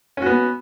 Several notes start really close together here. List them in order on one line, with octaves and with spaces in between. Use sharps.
C#4 F#4 B3